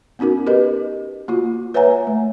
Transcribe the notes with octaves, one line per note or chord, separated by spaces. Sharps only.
B3 C#4 D#4 F#4 A#4
G4 A#4 B4 D#5
A#3 F4 F#4
B4 C#5 E5 F#5 G#5 A#5
A3